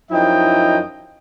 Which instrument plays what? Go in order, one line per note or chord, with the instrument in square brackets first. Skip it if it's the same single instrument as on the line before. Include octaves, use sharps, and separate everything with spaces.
[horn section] F#2 F3 D#4 E4 D#5 G5